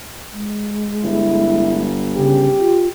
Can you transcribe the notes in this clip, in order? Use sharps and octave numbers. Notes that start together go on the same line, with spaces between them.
G#3
G1 E4
C#3 G4
F4